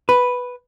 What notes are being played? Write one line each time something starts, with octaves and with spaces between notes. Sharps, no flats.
B4